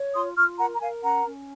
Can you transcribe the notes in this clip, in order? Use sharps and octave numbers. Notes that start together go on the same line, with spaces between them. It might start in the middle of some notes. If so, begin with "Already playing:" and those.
Already playing: C#5
F4 C6 D#6
F4 C#6 F6
A#4 F#5 A#5
A#5
A#4 F5 G#5
C#4 F#5 A#5
C#4